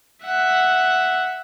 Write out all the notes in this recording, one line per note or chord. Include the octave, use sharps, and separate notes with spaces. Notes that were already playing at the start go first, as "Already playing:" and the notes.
E5 F#5